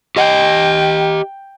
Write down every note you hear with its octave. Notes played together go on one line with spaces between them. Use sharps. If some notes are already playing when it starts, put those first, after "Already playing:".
G4 D#5 G5